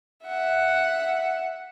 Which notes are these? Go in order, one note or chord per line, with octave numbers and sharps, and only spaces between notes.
E5 F#5